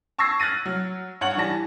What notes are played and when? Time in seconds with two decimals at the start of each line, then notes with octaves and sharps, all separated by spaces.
0.18 A5 C#6 E6 G#6 A#6 C7
0.40 F6 F#6 A6 A#6 D#7
0.66 F#3
1.21 G2 C#5 F#5 F#7
1.37 E3 G3 A5 A#6